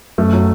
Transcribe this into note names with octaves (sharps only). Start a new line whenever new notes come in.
F#2 A3
F#3